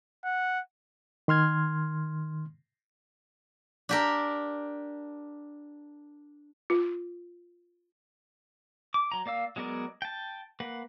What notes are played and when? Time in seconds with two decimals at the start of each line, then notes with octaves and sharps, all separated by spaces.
0.25 F#5
1.28 D#3 C6 F6 G#6
3.89 D4 G4 A#4
6.70 F4
8.94 D6
9.12 F#3 A#5
9.26 A#3 D5 F5 E6
9.56 F#3 G#3 B3 A#4 D5
10.02 G5 A5
10.60 A#3 B4 F#5